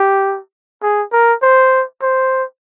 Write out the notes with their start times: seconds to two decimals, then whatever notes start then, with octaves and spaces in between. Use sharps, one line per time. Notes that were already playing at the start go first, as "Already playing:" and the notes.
Already playing: G4
0.82 G#4
1.13 A#4
1.42 C5
2.02 C5